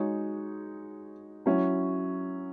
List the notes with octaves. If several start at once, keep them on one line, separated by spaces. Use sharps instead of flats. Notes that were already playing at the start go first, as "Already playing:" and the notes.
Already playing: G#3 D#4 F#4 C#5
F#3 C#4 E4